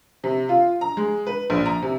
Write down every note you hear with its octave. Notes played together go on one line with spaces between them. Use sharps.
C3
F4
A#5
G#3
B4
A#1
A#5
C3